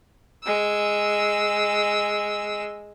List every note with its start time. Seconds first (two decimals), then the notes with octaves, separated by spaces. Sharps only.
0.43 G#3 E6